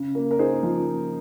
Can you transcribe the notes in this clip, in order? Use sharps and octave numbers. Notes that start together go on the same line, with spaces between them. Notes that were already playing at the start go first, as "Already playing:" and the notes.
Already playing: C#3
A#3
A#4
D#4 G#4 C5
F3